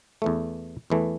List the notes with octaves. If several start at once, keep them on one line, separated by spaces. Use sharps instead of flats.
E2 E3 A3
E2 E3 A3